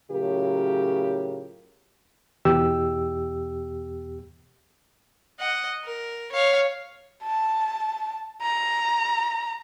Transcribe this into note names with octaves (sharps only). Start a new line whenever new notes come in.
A2 C#3 F#3 F4 G4 A#4
E2 B2 G4 E6
D#5 F#5
A#4
C#5 F5
A5
A#5